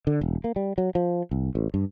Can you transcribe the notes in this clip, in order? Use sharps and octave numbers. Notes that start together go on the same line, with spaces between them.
D3
E1
A#3
G3
F#3
F3
C2
A1
G2